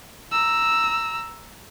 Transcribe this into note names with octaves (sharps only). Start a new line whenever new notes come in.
A#5 E6